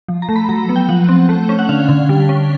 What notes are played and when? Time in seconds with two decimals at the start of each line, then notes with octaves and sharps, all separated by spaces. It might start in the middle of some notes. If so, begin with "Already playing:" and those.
0.08 F3
0.22 A#5
0.29 A3
0.36 B5
0.49 F#3 A#5
0.69 B3
0.76 G5
0.89 F3 F#5
1.09 C4
1.29 A3
1.49 C#4
1.59 F#5
1.69 D3 F5
1.89 D3
2.09 G3
2.29 C#4